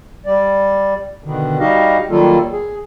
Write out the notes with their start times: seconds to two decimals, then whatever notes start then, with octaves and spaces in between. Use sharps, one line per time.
0.26 G3 D5
1.24 B2 D3 D#3
1.60 G3 D#4 F#4 G4 D#5 F5
2.10 D#3 F#3 G3 A#3 F4 A4
2.52 G#4